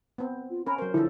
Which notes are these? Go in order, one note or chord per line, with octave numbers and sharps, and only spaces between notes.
B3 C4
F4
C#4 A#4 B5
F#3 A#4 C5
D3 F3 E4 A4